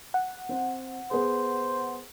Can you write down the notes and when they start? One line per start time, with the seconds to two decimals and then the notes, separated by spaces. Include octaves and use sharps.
0.14 F#5
0.49 C4
1.11 B3 G#4 C5